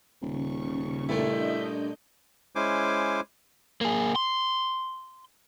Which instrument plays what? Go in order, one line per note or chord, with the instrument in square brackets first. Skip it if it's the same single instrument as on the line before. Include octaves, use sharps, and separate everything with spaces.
[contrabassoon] D#1 [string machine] C#3 C#6
[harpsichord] G2 A#2 A3 [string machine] D4 D#5 G6 [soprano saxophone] E4
[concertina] G#3 C#4 E4 C5 G#5 D6
[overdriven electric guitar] A#3 G#4
C6